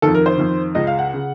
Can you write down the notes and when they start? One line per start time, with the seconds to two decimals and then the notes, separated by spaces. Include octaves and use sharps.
0.02 F2 D#3 A4
0.15 A#4
0.26 C5
0.38 F2 D#3
0.75 C#2 C#3 D#5
0.87 F5
0.99 F#5
1.14 C#3